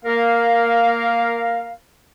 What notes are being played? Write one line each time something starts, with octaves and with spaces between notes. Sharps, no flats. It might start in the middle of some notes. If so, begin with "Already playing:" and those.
A#3 A#4 F5